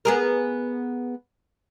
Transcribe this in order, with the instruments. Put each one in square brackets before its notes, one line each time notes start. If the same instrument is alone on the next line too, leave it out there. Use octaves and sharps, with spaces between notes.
[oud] B3 G#4 A#4